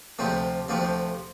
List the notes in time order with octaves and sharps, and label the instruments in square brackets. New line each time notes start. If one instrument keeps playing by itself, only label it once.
[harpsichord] D2 C3 F3 A3 C4
D2 C3 F3 A3 C4